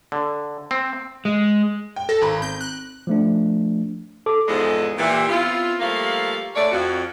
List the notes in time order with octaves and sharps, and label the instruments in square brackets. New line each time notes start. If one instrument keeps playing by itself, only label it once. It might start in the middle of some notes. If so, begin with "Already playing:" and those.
[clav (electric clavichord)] D3
C4
[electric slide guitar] G#3
[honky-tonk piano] G5
[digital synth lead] A4 [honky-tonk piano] A#6
[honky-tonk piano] G#1 A#5 B5
[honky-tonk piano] C4 [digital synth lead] G6
[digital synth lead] F#6
[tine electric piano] F3 A3 D4
A4 D6
[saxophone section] E2 G#2 F3 G#3 A4 B4
A#2 E3 G4
B3 C4 E4 F4
F3 G3 A3 A#3 F5
G#3 A3 D4 C#5 D5
F2 F#4